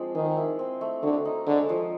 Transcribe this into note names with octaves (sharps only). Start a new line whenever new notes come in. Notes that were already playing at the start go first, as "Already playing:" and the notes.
Already playing: F3 G#3 C4 D4
D#3 G#4
E4
C4
A3
D3 F#4
D#4
D3 G#3
F3